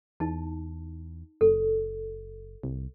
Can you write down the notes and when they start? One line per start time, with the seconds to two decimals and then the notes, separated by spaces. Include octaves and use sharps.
0.20 E2 D#4 A5
1.41 F#1 A4
2.63 C2